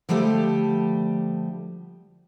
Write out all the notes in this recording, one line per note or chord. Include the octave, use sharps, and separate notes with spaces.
D3 F3 G3 A3 G4